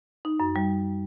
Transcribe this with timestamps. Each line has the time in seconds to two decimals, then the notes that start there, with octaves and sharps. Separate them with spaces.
0.25 D#4
0.40 F#2
0.56 G3